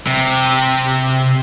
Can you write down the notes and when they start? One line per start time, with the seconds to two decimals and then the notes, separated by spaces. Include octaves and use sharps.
0.07 C3